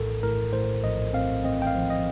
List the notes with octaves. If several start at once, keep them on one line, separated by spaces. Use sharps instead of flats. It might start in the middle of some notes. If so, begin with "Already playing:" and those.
Already playing: A#1 A2 A4 A#4
A2 A#4
A2 C5
A#1 D#5
C4 F5
C4 D#5
G5
F5
F3
D#5